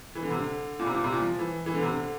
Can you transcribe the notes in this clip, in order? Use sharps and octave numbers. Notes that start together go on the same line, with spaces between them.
E3
D3
C3
D3
A#2
C3
A#2
C3
A#2
F3
E3
E3
D3
C3
D3